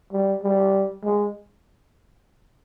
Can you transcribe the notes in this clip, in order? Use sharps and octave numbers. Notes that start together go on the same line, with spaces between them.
G3
G3
G#3